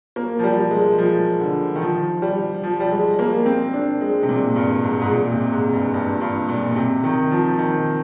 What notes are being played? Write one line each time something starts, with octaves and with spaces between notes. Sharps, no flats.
A#3
F3
G3
G#3
F3
D3
D#3
F3
G3
F3
G3
G#3
A#3
C4
D4
G#3
C3
A#2
G2
G#2
G#2
A#2
C3
G#2
G2
G2
G2
A#2
C3
D#3
F3
D#3